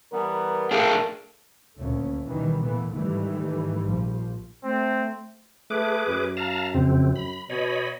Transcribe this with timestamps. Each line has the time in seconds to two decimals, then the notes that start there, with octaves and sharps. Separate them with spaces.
0.13 E3 G3 B3 A#4
0.71 A3 D4 G#4 A#4 F5 G5
1.78 D2 A#2 A3 C#4
2.26 B2 D#3 E3 G3
2.62 A#2 E3 A3 B3
2.92 G#2 D#3 E3 G3 A3
3.85 A#1 F3
4.64 A3 C4
5.70 A3 G#4 B4 D6
6.07 F#2
6.37 F5 A5 A#5
6.74 F2 C#3 C4
7.16 B5
7.50 B2 C#5 D#5 B5